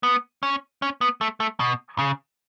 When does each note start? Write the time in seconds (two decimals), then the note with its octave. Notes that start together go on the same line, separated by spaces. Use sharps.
0.03 B3
0.43 C#4
0.82 C#4
1.01 B3
1.21 A3
1.40 A3
1.60 B2
1.99 C#3